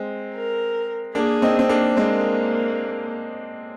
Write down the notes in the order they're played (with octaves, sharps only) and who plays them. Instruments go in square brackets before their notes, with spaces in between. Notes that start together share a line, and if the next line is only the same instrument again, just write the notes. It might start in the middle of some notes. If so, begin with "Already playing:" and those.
Already playing: [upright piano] G#3 C4
[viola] A#4
[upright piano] A#3 D4 [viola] G#4
[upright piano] C4 D#4
C4
A#3 D4
[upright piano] G#3 C4 [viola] A#3